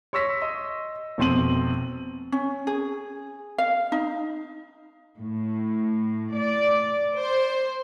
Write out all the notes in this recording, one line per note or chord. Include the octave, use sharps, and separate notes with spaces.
C#5 C6 C#6 E6 A#6 B6
D#5 C6
F1 B2 C4 C6 D#7 F#7
C#4
G#4
F5
D#4
A2
D5
C5